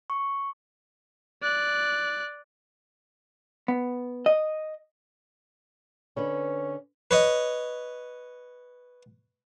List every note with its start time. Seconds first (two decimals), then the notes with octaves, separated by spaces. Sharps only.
0.10 C#6
1.43 D5 F#6
3.68 B3
4.26 D#5
6.17 D3 C#4 B4
7.11 B4 C#5 D#5